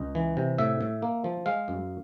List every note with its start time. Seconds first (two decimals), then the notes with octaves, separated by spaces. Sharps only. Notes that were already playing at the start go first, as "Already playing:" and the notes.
Already playing: C#2 D#5
0.15 E3
0.37 C3
0.58 A2 E5
0.81 A2
1.02 A#3
1.24 F3
1.46 G#3 F5
1.68 F#2